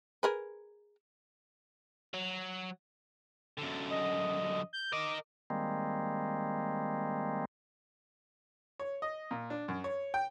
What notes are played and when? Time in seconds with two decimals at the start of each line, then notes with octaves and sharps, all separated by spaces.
0.23 G#4 A#4 B4
2.14 F#3
3.58 F#2 D3
3.90 D#5
4.73 G6
4.92 A#4 D#5 D6
5.50 D#3 G3 G#3 A#3 C4
8.80 C#5
9.02 D#5
9.31 A#2
9.50 D4
9.68 F#2
9.84 C#5
10.14 G5